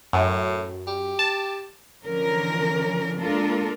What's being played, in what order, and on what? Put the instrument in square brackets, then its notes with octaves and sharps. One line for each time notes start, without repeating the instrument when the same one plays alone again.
[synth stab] F#2 [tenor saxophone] A2
[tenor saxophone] G4
[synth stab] A5
[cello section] D3 E3 F3 C#4 A#4
G#3 A#3 D4 F4 A4 A#4